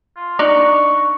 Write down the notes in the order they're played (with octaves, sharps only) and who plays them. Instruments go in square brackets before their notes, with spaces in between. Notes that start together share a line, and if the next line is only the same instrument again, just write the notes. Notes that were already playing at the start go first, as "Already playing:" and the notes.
[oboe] F4
[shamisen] D4 D#4 D5 [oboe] C#6